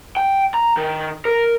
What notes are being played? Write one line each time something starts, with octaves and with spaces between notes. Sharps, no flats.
G5
A#5
D#3
A#4